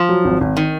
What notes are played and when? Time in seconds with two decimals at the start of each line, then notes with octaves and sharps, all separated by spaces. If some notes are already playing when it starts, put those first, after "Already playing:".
Already playing: F3
0.09 F#3
0.25 G#1
0.41 G#1
0.57 D#3